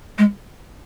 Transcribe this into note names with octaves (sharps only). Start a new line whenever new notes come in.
G#3